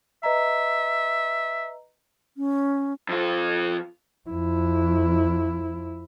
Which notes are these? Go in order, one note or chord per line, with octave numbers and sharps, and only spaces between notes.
B4 D#5 E5 A#5
C#4
F2 F4
F2 E4